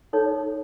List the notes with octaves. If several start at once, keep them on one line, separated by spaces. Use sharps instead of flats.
D#4 A4 C#5